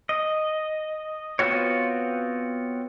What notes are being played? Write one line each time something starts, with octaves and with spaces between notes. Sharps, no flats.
D#5
B3 C4 F4 F#4 C#5